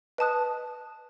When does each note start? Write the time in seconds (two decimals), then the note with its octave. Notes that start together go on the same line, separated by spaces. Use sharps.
0.18 B4 D#5 A5 D#6 F#6